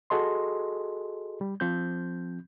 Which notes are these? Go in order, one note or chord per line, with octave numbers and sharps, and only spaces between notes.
F#4 G#4 A4 D#5 C6
G3
F3 C4 G6